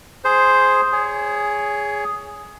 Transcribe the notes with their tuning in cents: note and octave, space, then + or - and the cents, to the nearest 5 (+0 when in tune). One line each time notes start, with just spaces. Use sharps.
G#4 +0 C5 +0
G#4 +0 C#5 +25